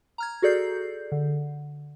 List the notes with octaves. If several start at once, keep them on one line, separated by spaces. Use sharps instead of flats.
A#5 F6 G#6
F#4 G#4 A4 D5 G6 C7
D3